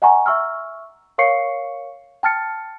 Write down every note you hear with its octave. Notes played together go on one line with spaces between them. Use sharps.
D#5 F#5 G#5 A#5 C#6
E5 C#6 E6 F6
A#4 C#5 F5 C#6 C7 C#7
G5 A5 F6 A6 C#7